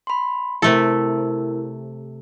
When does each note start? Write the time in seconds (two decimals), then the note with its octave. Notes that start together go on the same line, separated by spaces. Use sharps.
0.07 B5 C6
0.62 C3 A3 E4 A4 A#4